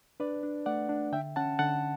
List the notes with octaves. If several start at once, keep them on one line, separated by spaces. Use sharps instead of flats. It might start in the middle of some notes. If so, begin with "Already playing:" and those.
D4 B4 D5
D4
A3 D5 F#5
D4
D3 E5 G5
C#4 F#5 A5
D3 F#5 A5